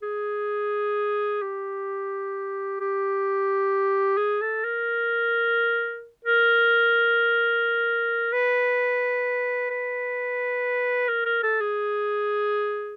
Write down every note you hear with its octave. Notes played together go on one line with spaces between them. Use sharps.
G#4
G4
G4
G#4
A4
A#4
A#4
B4
B4
A#4
A#4
A4
G#4